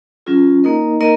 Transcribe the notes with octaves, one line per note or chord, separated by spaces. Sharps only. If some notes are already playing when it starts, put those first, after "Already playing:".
F#3 C#4 F4 G#4
A#3 D#4 A#4 D#5
A#3 D#4 A#4 D#5